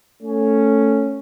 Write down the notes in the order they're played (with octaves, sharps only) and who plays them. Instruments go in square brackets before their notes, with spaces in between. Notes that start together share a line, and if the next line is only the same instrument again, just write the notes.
[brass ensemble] A3 C#4